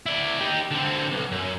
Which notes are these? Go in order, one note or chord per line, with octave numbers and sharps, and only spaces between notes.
E4 D5
D#4 G4
D3 C4
B1
F#2